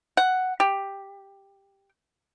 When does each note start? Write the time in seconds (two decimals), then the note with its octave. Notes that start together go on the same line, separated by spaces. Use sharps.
0.17 F#5
0.60 G4